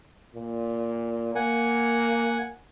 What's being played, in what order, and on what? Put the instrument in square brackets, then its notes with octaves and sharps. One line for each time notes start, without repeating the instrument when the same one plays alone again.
[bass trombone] A#2
[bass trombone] A#3 [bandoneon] F#5 G#5